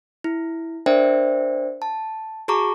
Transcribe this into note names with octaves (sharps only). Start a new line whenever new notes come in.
E4
D4 A#4 C5 D5 E5 G5
A5
F#4 G#4 A5 A#5 C#6 D6